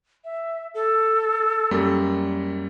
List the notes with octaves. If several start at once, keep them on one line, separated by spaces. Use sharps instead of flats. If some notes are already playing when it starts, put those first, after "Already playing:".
E5
A4
F#2 G3 A#3